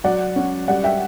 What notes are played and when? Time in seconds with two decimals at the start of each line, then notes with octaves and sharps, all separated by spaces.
0.04 F#3 D5 F#5
0.36 C#4
0.68 G3 D5 F#5
0.84 E5 G5